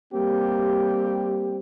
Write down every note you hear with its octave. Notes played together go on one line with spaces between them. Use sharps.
G3 A#3 C4 G4